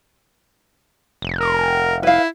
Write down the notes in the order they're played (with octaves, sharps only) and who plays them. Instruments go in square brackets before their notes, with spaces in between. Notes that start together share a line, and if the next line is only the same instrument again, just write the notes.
[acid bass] F1
[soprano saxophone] A#4
[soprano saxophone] E4 [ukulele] B4 F5